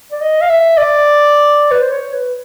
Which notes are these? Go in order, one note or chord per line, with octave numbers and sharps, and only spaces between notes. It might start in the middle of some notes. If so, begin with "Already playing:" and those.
D5
D#5
F5
E5
D5
B4
C5
C#5
B4